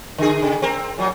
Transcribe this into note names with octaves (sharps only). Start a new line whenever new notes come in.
D3 G#4
C#3
C4 A#4
A#2 F#3